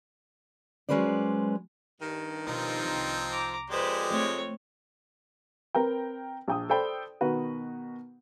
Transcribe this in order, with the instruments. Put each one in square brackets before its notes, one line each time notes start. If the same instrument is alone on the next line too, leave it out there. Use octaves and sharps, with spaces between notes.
[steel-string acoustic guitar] F#3 G#3 C#4 B4 C5 D5
[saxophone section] G2 D#3
[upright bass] B2 [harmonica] F3 C4 D#4
[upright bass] C2
[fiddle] A#5 D6
[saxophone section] F2 [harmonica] G#3 G4 D5 [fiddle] B4 C5
[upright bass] A3 [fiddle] C4 C#5
[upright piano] C4 A#4 B4 G5
A#1 G5 D#6
A4 C5 D5 G5 B5
B2 D#3 F#4 B4